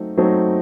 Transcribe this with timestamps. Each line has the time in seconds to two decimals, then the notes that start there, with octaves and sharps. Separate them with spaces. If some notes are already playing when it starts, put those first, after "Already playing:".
Already playing: F#3 A3 C4 D#4
0.17 F#3 A3 C4 D#4